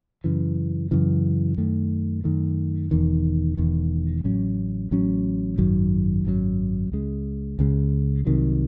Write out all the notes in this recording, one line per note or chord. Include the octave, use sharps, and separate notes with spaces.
F#2 C#3 E3
F#2 C#3 E3
F#2 D#3 A3
F#2 D#3 A3
E1 E2 D#3
E1 E2 D#3
A1 A2 F#3 C#4
A1 A2 F#3 C#4
G#1 F#2 D#3 F#3
G#1 F#2 D#3 F#3
C#2 C#3 G#3
C#2 C#3 G#3
C2 C3 D#3 F#3